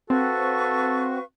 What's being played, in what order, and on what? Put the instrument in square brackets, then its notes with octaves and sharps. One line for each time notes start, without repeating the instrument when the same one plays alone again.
[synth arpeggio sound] C4 [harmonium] F#4 [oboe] A4 [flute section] B4 F5 C#6